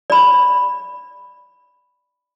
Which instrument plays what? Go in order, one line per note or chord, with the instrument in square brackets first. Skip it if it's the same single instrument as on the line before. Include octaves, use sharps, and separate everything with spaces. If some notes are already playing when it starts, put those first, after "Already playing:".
[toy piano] D5 B5